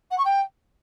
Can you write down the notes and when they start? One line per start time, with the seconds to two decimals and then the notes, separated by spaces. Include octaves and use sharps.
0.11 F#5
0.18 C#6
0.25 G5